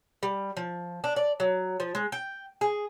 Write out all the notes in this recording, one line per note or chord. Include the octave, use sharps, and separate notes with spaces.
G3
F3
D4
D5
F#3
F3
G#3
G5
G#4